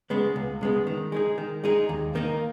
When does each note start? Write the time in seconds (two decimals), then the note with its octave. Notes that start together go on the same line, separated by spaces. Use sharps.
0.10 C#3 G#3 B3
0.36 C#2
0.61 C#3 G#3 B3
0.87 D#3
1.12 G#3 D#4 G#4
1.38 D#3
1.64 G#3 D#4 G#4
1.89 D#2
2.15 D#3 A#3 D#4